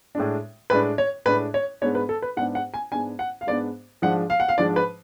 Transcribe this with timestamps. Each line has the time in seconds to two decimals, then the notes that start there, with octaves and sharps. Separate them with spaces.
0.15 A2 G#3 D4
0.70 A2 G#3 D4 B4
0.98 C#5
1.26 A2 G#3 D4 B4
1.54 C#5
1.81 G#2 G#3 B3 D4 C#5
1.95 B4
2.09 A4
2.22 B4
2.37 G#2 G#3 B3 D4 F#5
2.55 F#5
2.74 G#5
2.92 G#2 G#3 B3 D4 G#5
3.19 F#5
3.41 F5
3.47 G#2 G#3 B3 D4 D5
4.02 G#2 F3 G#3 D4 F#5
4.30 F5
4.40 F#5
4.48 F5
4.58 G#2 F3 G#3 D4 D5
4.76 B4